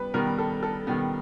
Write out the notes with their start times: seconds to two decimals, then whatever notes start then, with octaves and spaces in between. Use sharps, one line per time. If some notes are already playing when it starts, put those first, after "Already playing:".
Already playing: G3 B3 B4
0.14 D#3 G3 B3 A#4
0.38 A4
0.63 A4
0.87 D#3 G3 B3